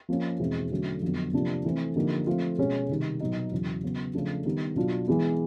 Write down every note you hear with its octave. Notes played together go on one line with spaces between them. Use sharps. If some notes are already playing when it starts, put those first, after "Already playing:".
F3 A#3 C#4
E2 B2 G#3 C4 E4
D3 F#3 A3 C#4 F#4
F2 D3 F#3 B3
C3 F3 A#3 D4 F4
E3 A3 C4
D3 F3 A#3 D#4 G4
F3 A3 C4 F4
B2 G#3 C#4 F#4
C3 D#3 G3
B2 F#3 B3 D#4
E2 C#3 F#3
C#3 F#3 B3
C#3 F3 A3 D4
D#3 G3 B3
B2 F#3 B3 D4 F4
E3 G#3 B3